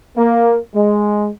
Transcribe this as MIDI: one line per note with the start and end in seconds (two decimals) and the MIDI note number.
0.16 0.58 58
0.74 1.28 56